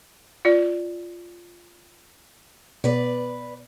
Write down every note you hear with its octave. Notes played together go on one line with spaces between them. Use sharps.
F4 D5
B2 B3 B4 D5